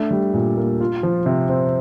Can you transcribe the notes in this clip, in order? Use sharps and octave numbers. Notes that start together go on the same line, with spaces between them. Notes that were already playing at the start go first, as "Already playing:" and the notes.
Already playing: A3 D4
G3
A#2
A#3
F4
F3
C3
C4